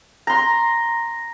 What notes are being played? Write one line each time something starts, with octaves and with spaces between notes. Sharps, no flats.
A#5 C6